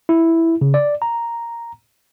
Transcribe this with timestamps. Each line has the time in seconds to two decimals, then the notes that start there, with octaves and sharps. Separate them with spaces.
0.09 E4
0.61 C#3
0.74 D5
1.02 A#5